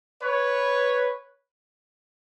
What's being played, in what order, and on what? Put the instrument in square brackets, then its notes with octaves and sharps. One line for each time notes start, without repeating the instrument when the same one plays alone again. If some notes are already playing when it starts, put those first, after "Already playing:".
[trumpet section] B4 C#5